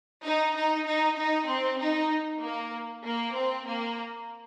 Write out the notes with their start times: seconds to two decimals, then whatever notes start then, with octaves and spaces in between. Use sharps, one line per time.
0.25 D#4
0.56 D#4
0.86 D#4
1.18 D#4
1.48 C4
1.79 D#4
2.41 A#3
3.04 A#3
3.34 C4
3.65 A#3